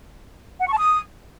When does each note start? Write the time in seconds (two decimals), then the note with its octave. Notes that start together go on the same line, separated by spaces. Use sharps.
0.62 F#5
0.67 C#6
0.72 A5
0.78 D#6